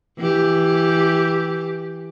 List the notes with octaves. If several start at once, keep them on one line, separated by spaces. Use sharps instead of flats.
E3 G4